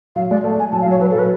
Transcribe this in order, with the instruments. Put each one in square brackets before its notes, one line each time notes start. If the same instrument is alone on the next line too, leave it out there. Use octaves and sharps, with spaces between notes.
[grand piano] F#3 [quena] F5
[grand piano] G#3 [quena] D5
[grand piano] A3
[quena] G#5
[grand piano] F#3 [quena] A5
[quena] F5
[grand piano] F#3
[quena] C#5
[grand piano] F#3 [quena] B4
[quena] A4
[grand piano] F#3
[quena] B4